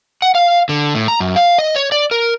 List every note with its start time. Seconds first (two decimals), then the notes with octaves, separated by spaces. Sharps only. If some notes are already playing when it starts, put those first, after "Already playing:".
0.22 F#5
0.35 F5
0.69 D3
0.95 A2
1.08 A#5
1.20 F#2
1.36 F5
1.58 D#5
1.76 C#5
1.92 D5
2.11 A#4